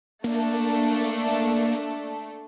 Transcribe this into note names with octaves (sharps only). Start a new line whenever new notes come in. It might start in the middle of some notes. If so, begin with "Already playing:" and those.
A3 A#3 D4